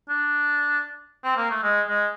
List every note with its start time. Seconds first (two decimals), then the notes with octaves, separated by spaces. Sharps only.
0.09 D4
1.24 C4
1.37 A#3
1.51 A3
1.63 G#3
1.88 G#3